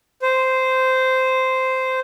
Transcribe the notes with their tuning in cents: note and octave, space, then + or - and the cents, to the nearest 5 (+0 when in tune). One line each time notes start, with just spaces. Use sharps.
C5 -10